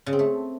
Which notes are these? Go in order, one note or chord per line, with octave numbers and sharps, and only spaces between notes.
C#3
C4
A3